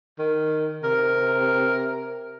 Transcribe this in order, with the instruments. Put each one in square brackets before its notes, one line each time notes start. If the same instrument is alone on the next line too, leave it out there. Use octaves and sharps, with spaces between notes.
[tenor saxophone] D#3
[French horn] C3 [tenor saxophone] A#4